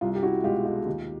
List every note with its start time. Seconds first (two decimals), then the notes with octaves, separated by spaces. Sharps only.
0.01 C2 F4
0.15 G4
0.23 E4 F#4
0.44 B2 G#3 F4 G4
0.65 F4 G4
0.86 D#2